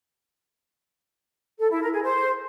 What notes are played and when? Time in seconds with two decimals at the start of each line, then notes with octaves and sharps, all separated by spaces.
1.59 A4
1.70 E4
1.81 A#4
1.92 G#4
2.03 C5